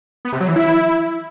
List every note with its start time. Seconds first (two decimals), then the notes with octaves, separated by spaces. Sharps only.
0.25 B3
0.33 C3
0.40 F#3
0.48 E3
0.56 E4